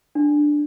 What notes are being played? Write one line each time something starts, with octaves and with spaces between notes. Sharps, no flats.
D4